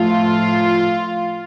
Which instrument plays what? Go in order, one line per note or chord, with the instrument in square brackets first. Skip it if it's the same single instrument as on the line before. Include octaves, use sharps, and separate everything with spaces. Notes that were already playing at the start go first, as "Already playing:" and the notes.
Already playing: [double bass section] A2 F3 A3 [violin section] F4